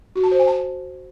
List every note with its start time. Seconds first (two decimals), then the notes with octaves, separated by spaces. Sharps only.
0.16 F#4
0.23 A5
0.31 C5
0.39 G#5
0.47 A5